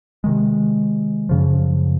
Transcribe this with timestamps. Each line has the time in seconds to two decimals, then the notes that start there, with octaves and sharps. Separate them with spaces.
0.24 C3 D#3 G#3
1.29 F#2 C#3 F3